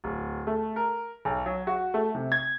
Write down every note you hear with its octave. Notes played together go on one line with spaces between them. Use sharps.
D1
A3
A#4
B1
F#3
F#4
A3
C3
G#6